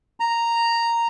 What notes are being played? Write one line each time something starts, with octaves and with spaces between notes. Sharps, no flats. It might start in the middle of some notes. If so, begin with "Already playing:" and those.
A#5